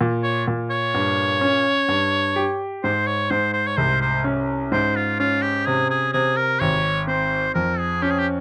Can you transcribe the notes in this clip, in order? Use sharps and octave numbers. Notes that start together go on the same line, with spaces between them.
A#2
C#5
A#2
C#5
G2
C#4
G2
G4
G#2 C5
C#5
G#2 C5
C5
C#5
C2 C5
C5
C#4
G#2 C5
F4
C#4 F4
G4
C3 G#4
G#4
C3 G#4
A#4
G#1 C#5
C4 C5
F2 A#4
G#4
C#4 G4
G#4
G4